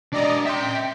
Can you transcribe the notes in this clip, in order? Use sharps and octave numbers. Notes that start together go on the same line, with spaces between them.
G#3 D4 D5 D#5 A#5
E5 G5 C6